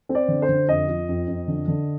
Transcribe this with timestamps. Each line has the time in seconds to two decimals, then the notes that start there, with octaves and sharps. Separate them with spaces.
0.09 C4
0.15 D5
0.28 D3
0.42 C5
0.49 D3
0.68 F2 D#5
0.87 F3
1.08 F2
1.27 F2
1.48 D3
1.68 D3